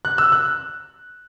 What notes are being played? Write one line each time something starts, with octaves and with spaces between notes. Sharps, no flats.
F#6
E6
F#6